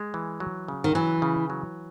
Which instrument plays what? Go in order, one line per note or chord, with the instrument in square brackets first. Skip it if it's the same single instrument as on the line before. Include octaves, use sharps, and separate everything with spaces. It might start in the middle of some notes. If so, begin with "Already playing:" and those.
Already playing: [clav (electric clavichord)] G#3
E3
F#3
C#3
[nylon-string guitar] D#3
[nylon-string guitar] E3 [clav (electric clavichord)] F#3
[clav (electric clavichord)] C#3
F#3